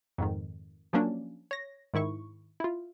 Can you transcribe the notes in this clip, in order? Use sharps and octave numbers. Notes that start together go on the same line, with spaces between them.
F2 G#2 D#3
F3 F#3 A#3 C#4 D4
C#5 A#6
G#2 D#3 E4 C#6
E4 F4